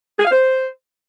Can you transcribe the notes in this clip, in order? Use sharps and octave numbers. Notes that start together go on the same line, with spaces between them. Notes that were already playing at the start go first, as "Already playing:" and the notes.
G#4
F5
C5